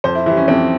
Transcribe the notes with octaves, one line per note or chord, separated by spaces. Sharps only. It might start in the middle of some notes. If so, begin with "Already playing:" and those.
F2 C5
E4
E3 G3 E4
C#4
F2 C4